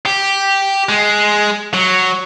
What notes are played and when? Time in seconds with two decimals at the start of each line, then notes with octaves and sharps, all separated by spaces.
0.06 G4
0.89 G#3
1.74 F#3